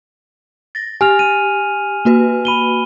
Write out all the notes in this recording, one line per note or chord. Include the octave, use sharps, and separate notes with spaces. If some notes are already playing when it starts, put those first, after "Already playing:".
A6 A#6
G4 G#5 F6 F7
D#7
A#3 F#4 B4
B5 D#7 G7